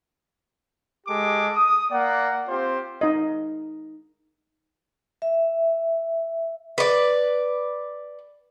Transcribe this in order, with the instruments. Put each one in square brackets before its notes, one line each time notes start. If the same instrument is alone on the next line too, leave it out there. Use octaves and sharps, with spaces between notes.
[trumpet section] G#3 G4 A4 D6
D#6
A#3 D5 F#5
C4 F4 G4 C5
[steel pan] D#4 D#5
[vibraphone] E5
[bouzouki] B4 D5